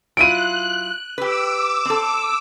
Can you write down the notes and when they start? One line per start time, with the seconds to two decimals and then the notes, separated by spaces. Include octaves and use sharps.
0.17 F#3 E4 F4 F#6 D7 D#7
1.18 G4 B4 D6 E6
1.85 C4 A4